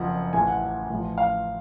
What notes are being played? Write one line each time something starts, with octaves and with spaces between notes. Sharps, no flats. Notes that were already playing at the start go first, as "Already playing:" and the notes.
Already playing: F#1 F2 F3 F#5
A1 A2 F3 G#5
F#5
A1 A2 F3
F5